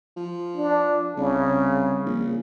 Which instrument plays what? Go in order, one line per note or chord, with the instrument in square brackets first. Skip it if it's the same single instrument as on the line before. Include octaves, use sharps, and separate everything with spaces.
[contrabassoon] F3
[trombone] D4
[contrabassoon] C2 [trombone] C#3
[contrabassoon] A#1